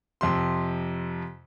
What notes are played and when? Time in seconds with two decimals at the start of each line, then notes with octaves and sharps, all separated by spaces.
0.21 F2 C3 C6